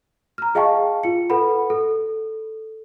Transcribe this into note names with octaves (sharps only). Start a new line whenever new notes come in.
A#5 F6
G#4 D#5 F5 G5 A5 C#6
F4 C#7
A4 B4 F#5 B5
A4